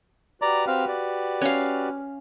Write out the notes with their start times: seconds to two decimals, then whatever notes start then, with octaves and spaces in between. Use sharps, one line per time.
0.42 F#4 G4 B4 D5 A#5
0.67 C4 F5
0.88 D5
1.41 C#4 F5